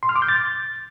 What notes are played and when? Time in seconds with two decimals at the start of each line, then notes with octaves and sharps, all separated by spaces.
0.03 C6
0.09 F6
0.16 D6
0.22 G6
0.29 A6